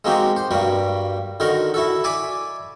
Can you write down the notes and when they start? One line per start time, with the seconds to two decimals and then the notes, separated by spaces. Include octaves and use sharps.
0.05 G#3 A#3 C4 D#4 F#4 G4
0.36 C5
0.51 G2 G3 A#3 F#4
1.40 D3 D#3 D#4 F#4 A#4
1.74 E4 F#4 A4
2.04 D5 E5 G#5 B5 D6